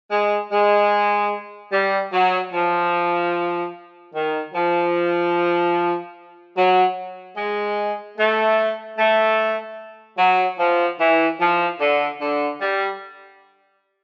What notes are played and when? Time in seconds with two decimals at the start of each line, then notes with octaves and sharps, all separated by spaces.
0.11 G#3
0.52 G#3
1.73 G3
2.12 F#3
2.53 F3
4.14 D#3
4.54 F3
6.57 F#3
7.37 G#3
8.18 A3
8.99 A3
10.18 F#3
10.59 F3
11.00 E3
11.40 F3
11.80 D3
12.21 D3
12.61 G3